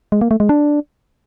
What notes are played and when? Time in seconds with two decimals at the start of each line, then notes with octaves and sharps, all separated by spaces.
0.12 G#3
0.21 A#3
0.31 A3
0.40 G#3
0.49 D4